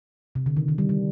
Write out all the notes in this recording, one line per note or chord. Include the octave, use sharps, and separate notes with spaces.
C3
D3
D#3
D#3
G3
G3